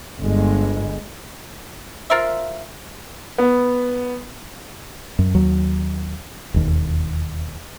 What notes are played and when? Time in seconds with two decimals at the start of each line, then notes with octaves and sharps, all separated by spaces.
0.20 G1 G#3
2.10 F4 A#4 C5 E5
3.38 B3
5.19 F#2
5.34 D#2 F#3
6.54 E1 D#2